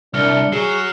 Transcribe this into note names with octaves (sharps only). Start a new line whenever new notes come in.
C2 D4 F6 C#7 G7
F#3 G#4 C7 E7